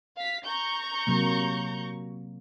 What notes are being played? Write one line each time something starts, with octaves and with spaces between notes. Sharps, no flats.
F5 B6
A#5 C#6 G6
C3 F#3 A#3